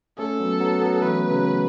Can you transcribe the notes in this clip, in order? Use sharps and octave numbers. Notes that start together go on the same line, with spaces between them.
A3 C#4 A4
F#3 B3
F#3 B3
F#3 B3
E3 A3 B4
C#3 F#3